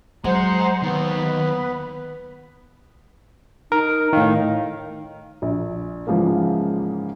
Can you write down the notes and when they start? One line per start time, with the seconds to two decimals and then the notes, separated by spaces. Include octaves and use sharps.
0.24 F#3 G#3 C5 F#5 A#5
0.82 D#2 D#3 B3
1.06 B4 B5
3.72 D#4 A#4
4.13 A2 D#3 F5
5.42 A#1
6.07 G#2 C#3 E3 F3 G#3 A#3